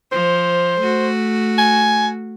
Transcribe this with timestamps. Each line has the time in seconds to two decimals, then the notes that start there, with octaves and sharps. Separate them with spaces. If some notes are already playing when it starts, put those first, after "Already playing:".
0.12 F3 C5
0.81 A3 F#4
1.58 G#5